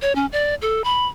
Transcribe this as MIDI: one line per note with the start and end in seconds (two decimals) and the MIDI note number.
0.02 0.15 73
0.15 0.26 61
0.32 0.55 74
0.62 0.82 69
0.84 1.06 83